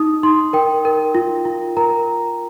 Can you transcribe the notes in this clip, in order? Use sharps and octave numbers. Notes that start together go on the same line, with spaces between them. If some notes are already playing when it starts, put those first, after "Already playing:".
Already playing: D#4 D#6
D#4 C6
A#4 G5
A#4
F4
F4
A#4 A#5